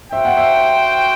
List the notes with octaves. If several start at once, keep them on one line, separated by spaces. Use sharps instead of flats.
F#4 C5 E5 G5
F#5
E5